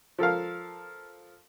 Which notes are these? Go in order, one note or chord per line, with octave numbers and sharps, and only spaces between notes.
F3 A4 A#4 F5